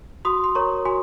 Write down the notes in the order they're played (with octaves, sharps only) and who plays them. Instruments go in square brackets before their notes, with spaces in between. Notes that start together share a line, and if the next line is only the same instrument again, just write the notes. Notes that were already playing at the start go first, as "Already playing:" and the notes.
[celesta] F#4 C6 D#6
C6
A#4 C#5 A#5 C#6
F#4 G#5 C6